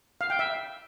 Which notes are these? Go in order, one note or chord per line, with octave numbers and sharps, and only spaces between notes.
F5
G5
E5